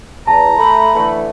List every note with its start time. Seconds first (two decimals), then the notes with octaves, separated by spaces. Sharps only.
0.27 E2 A5 A#5
0.58 A3 B5
0.94 D3 E3 A3